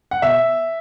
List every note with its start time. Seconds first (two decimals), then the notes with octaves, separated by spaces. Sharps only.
0.11 F#5
0.22 B2 E5